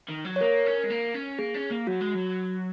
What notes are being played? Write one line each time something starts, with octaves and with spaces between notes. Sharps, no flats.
D#3
F#3
C#5
A#3 A#4
C#4
G#3
A#3
C#4
A#3 G#4
C#4
A#3
F#3 F#4
G#3
F#3